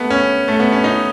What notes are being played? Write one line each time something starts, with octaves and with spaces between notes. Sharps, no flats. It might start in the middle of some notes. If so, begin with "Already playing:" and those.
Already playing: A3 B3
C#4
A3
B3
C#4
D#4